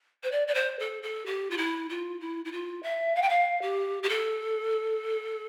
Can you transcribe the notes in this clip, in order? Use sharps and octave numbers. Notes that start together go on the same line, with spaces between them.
C5
D5
D5
C5
A4
A4
G4
F4
E4
F4
E4
E4
F4
E5
F5
G5
F5
G4
G4
A4